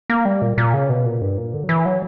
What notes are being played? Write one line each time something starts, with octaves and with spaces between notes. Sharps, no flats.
A#3
G3
A#2
A#2
C#3
B2
A#2
G2
A#2
D3
F#3
E3
F#3